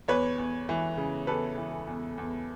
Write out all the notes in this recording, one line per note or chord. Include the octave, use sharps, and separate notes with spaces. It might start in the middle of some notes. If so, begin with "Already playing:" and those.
E2 B4 C#5
E2
E3
C#3
E2 A4 B4
E3
E2
E2